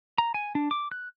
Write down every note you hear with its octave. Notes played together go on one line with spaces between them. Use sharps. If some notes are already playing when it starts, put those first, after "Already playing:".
A#5
G#5
D4
D6
F#6